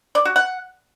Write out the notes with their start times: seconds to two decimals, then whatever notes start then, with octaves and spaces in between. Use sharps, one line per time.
0.15 D5
0.25 F#4
0.36 F#5